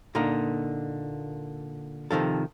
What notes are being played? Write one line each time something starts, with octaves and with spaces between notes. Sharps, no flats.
A#2 D3 A#3 D#4
C3 D#3 F3 A4